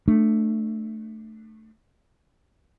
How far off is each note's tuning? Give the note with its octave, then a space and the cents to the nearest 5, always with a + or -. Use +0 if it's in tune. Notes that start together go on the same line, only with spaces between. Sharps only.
A3 +0 D4 +20